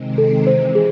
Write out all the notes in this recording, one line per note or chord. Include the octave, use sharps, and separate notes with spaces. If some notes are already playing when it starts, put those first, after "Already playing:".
Already playing: C3 D#3 G#3 C4
A4
C3 E3 G#3 C5
G#4